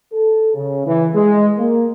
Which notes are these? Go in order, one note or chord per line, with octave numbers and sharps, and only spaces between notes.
A4
C#3
E3
G#3
A#3